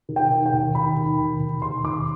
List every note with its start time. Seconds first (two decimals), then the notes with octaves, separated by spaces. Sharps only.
0.09 D#3
0.16 G5
0.30 D#3
0.46 G5
0.53 D#2
0.75 D#3 B5
0.97 D#3
1.18 D#2
1.40 D#2
1.62 D#2 C6
1.84 D#2 D6